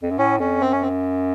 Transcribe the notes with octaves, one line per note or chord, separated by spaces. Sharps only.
F2
F#2
A2 C#4
F2 C#4
F#2 C4
C#4
C4